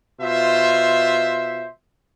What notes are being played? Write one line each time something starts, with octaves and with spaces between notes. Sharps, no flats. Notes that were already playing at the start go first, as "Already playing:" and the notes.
B2 F4 C5 E5